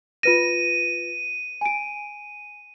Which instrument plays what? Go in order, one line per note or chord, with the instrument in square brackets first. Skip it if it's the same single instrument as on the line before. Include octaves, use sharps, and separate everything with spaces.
[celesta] F4 B4 A#6 [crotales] D#7
[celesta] G#5 D7